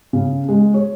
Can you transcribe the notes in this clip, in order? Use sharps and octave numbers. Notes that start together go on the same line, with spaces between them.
C#3
G#3
C#5